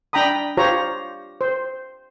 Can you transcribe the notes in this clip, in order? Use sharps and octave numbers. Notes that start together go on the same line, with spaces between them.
D4 G5 A#5 B5 D#6
F4 G4 C5 C#5 A#5
C5